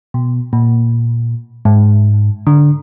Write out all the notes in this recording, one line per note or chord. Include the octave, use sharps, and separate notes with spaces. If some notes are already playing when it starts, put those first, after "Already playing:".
B2
A#2
G#2
D3